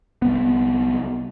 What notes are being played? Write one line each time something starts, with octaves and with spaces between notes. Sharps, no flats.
C2 B3